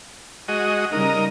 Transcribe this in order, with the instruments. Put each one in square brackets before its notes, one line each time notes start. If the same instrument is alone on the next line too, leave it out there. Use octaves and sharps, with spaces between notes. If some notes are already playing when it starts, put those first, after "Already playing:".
[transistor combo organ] G#3 F#4 D#5
[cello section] C#3 G3 D#4 [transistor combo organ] A#4 D#5